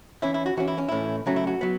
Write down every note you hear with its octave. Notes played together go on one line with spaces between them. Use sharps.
E3 C#4 E4
E4
F#4
E3 C#4 F#4
E4
C#4
A2 E3 C#4 E4
C#3 F#3 A3 C#4 F#4
E4
F#4
F#3 B3